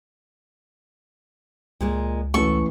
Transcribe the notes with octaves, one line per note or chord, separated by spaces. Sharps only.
C#2 A#2 G#3 A#3
A1 E3 F#4 A4 C#6